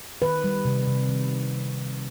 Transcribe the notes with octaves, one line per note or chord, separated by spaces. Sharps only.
D#3 B4
G3
C3
C3
D#3